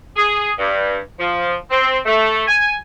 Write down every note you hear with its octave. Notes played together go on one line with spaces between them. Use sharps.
G#4
G2
F3
C4
A3
G#5